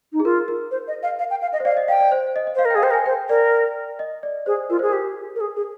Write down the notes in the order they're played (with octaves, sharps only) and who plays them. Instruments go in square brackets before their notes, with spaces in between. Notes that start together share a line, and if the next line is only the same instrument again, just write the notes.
[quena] D#4
[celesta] G#4
[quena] F4 [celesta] A#4
[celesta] A#4
[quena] C5
D#5
F5
F5
G5
F5
D#5
[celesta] C5
[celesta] D5 [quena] F5
[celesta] D#5
[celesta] F5 [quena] G5
[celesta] D5
C5
D#5
D#5
[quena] C5 [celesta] F5
[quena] A#4
[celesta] G5
[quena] G#4 [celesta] F5
[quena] C5 [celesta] G5
[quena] A#4
[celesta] G#5
[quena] C5 [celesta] G5
[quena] A#4 [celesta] D5
[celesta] D#5
D5
[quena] G#4 [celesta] C5
[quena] F4 [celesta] A#4
[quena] G#4 [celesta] C5
[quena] G4 [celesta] A#4
[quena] A#4
G#4
G#4